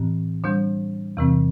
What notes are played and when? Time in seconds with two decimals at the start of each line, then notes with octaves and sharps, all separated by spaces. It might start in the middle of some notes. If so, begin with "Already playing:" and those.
Already playing: A2 E3 C4 G4
0.44 D3 G3 D4
1.17 E2 C3 E3 C4